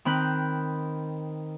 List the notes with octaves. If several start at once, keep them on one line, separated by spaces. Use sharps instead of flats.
D#3 C4 B5 F#6 G6